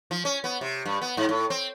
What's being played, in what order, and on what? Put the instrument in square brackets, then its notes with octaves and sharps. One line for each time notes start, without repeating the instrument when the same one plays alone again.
[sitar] F3
C#4
B3
C3
G2
B3
G#2
A2
C4